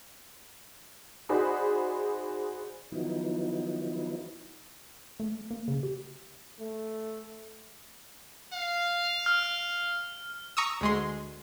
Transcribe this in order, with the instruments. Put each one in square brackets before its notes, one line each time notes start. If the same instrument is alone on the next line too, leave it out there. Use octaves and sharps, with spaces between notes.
[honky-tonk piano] D#4 F#4 G#4 C5 D5 B5
[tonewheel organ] D#3 F3 F#3 B3 D#4 E4
[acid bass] A3
A#3
C#3
G4
[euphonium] A3
[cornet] F5
[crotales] F6
[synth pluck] A#5 C#6 D#6 E6
D2 G#3 C6